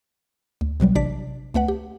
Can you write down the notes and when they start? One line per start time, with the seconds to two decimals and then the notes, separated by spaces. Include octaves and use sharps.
0.61 D2
0.80 B1 B2 F#3 G3
0.95 A1 C3 D4 D5 B6
1.54 C#2 A3 B4 F#5
1.68 G4